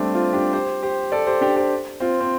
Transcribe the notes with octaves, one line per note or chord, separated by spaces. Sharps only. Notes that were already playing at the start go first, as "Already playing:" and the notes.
Already playing: G3 A3 C4 D4
C4 F4
D4 G4
G4 C5
G4 C5
A4 D5
G4 C5
D4 G4
G4 C5
C4 F4
C4